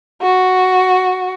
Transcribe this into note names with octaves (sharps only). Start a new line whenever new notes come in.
F#4